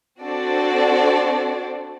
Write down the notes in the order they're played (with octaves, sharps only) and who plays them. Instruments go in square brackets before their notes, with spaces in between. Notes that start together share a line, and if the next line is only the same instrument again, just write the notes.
[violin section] C4 D4 F#4 A4 C5 D5